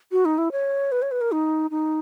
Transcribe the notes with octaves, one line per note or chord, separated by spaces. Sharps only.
F#4
D#4
E4
C#5
B4
C#5
B4
A#4
D#4
D#4